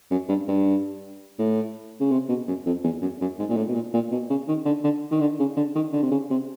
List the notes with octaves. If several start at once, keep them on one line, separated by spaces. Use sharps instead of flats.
F#2
G2
G2
A2
C#3
C3
B2
F#2
F2
E2
F#2
F#2
G#2
A#2
A2
B2
A#2
A#2
B2
C#3
D#3
D3
D3
D#3
D3
C#3
D3
D#3
D3
C3
C#3
C3